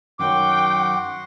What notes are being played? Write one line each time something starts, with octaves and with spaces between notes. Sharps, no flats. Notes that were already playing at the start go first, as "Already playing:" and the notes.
F#2 D#3 F#3 F#4 F#5 G5 C6 D6